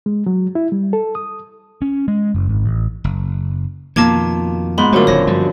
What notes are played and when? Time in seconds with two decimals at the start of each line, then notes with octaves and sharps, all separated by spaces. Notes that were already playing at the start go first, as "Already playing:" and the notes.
0.06 G#3
0.26 F#3
0.55 E4
0.72 G3
0.93 A4
1.15 D#6
1.82 C#4
2.08 G#3
2.35 F#1
2.49 G#1
2.66 A1
3.04 F#1
3.96 F2 B2 D#3 A#3 F4 A5 D6 G#6
4.78 G#2 B3 B5 C6 F#6
4.93 F#2 D3 A3 F4 A#4 C5
5.07 D#1 D#3 F#3 C#5 A#6
5.27 G2 F3 G3